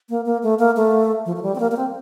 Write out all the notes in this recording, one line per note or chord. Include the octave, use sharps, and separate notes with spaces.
A#3
A#3
A3
A#3
A3
F3
F3
G3
C4
A#3
A#3
C4